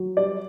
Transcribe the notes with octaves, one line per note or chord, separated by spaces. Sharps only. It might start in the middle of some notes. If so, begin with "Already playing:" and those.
Already playing: F#3
G3 D5